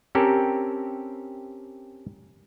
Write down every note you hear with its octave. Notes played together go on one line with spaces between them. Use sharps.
C4 C#4 G4 A4 A#4